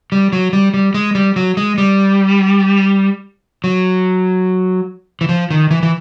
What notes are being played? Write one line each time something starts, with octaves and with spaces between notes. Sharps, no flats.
G3
F#3
G3
G3
G#3
G3
F#3
G#3
G3
F#3
E3
F3
D#3
E3
E3